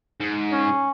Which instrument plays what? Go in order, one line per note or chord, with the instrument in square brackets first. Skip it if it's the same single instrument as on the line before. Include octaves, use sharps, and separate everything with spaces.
[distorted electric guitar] G#2
[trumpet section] C#4